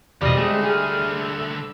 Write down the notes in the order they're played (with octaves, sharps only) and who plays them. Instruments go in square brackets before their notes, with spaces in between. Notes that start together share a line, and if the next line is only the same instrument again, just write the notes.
[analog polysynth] E2 B2 [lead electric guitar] F3 C4 [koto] G3 D#5
[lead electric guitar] D3 A3 [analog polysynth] G#3 [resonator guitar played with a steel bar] C4 G#4
[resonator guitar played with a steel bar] G#4 [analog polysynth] F6 D#7
[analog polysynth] E6